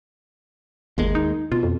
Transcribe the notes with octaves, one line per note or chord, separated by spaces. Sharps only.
G1 D#2 G#3 A#3
D#4
B2 F4
F2